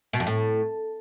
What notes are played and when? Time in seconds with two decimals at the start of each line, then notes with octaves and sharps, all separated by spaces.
0.13 B2
0.20 F2
0.27 A2